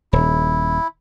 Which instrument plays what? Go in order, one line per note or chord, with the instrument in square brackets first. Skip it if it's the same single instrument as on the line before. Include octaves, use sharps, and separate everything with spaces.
[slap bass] D#1 [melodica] E4